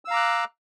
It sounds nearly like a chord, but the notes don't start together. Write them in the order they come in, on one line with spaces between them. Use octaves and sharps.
E6 F5 A#5 D6 F#6